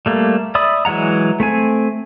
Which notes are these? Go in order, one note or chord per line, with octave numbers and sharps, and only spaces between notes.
G3 A3 A#3
D5 E5 B5 D#6
E3 F#3 G#3 F#5 A#5
A3 C4 G#5